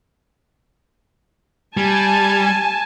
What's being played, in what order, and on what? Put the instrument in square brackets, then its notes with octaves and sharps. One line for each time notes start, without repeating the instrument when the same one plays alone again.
[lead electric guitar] G3 [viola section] G#5 A5